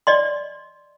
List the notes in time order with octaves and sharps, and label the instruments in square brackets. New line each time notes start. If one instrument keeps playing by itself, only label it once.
[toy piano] D5 D#5 C6